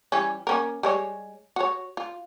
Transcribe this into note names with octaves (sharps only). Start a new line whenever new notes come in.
E3 G3 C#4
A#3 C#4 A#4
G3 G#3 C#5
F#4 C#5
F4